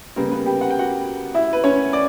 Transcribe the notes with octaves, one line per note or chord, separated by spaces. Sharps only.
C#3 G3 A#3 B3 A#4
B3 B4
G4 G5
F#5
G5
F#4 F#5
E4 E5
B4
C#4 C#5
D5